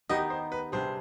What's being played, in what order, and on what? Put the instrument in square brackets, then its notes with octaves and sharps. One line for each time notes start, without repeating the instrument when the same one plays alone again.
[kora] D#3 B3 D#4 G4 [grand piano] D#5
[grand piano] C5
B4
[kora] C3 G3 D4 G#4 [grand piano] C5